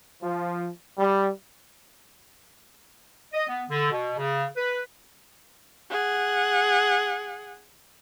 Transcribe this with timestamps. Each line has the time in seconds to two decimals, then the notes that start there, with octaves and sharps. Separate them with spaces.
0.22 F3
0.98 G3
3.33 D#5
3.48 B3
3.69 D3
3.91 B2
4.17 C#3
4.57 B4
5.91 G#4 F#5